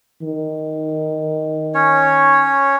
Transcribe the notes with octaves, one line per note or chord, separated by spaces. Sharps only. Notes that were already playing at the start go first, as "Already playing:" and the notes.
D#3
C#4 C#5